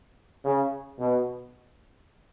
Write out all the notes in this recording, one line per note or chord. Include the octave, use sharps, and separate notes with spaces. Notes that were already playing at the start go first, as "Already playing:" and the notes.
C#3
B2